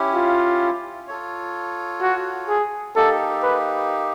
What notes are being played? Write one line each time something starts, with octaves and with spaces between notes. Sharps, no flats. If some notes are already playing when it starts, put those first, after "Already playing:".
Already playing: C#4 E4 G4
F4
F4 A4 C#5
F#4
G#4
A#3 D#4 G4 A4
B4